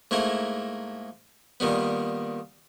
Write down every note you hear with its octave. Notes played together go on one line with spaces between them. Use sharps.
G#2 A3 A#3 E4 A#5
A#2 D#3 G3 B3